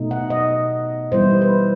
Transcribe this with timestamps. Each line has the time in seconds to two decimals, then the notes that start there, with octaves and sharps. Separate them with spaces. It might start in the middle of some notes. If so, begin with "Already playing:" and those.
Already playing: B2 A3 D#4
0.11 F#5
0.30 D#5
1.12 E3 G3 B3 E4 C5
1.42 B4